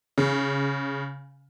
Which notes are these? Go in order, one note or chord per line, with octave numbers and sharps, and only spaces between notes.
C#3